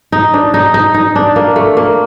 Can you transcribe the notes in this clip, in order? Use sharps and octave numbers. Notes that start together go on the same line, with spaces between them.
D#4
D4
D#4
D#4
D#4
D4
A#3
A3
A#3